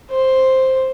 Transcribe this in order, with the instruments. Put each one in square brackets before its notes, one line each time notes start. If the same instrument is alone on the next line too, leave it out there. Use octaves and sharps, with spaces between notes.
[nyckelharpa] C5